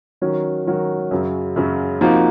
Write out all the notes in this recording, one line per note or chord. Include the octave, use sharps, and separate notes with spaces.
D#3 F#3 C#4 F#4 A#4
D#3 F#3 C#4 F#4 A#4
F#2 C#3 F#3
F#2 C#3 F#3
C3 F3 A#3 D#4 F#4